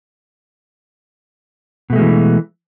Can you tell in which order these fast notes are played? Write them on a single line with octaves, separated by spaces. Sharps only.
B2 A3 G#3 F3 E3